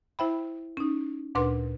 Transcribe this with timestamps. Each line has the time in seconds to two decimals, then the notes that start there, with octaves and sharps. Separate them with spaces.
0.19 E4 C5 E5 G5 B5
0.77 C#4 D#4
1.35 D2 A#2 D4 B4 C6 D6